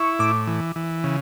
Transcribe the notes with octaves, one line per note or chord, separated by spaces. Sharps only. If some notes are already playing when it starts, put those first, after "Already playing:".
Already playing: E4 C#6
A2 D6
E3
E3
C#3